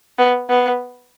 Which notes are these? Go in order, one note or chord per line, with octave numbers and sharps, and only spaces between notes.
B3
B3